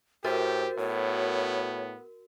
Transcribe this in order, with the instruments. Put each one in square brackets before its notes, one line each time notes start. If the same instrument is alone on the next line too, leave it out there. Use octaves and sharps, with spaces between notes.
[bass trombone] A2 [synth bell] F#4 A#4 [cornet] G4 [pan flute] C5
[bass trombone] A2 [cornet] B3 [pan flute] C#5